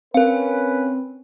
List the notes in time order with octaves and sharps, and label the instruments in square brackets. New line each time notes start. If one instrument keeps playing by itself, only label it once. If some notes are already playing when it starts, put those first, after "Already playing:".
[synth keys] C4 [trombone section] C#4 B4 [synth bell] A#4 F5